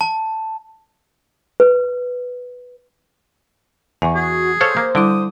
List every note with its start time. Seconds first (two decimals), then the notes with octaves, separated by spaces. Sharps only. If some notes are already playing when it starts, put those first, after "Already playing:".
0.01 A5
1.60 B4
4.02 E2 G#5 C#6
4.15 F#4 G#4
4.61 A4 C5 C#5 F5
4.77 A#3
4.95 D3 G3 E4 D6 D#6